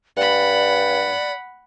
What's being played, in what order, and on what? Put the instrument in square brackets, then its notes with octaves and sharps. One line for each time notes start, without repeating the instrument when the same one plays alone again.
[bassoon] G2 [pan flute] D5 [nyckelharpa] F#5 B5